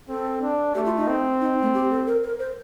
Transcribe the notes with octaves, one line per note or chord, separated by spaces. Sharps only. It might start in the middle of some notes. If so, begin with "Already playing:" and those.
C4 A4
D4
A3 G4
F4
D#4
C4
D#4
A3
G4
A4
A#4
A#4
C5